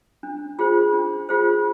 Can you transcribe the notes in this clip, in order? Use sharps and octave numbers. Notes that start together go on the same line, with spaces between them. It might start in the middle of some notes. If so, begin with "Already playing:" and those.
D4
F4 G#4 C5
D4
F4 G#4 C5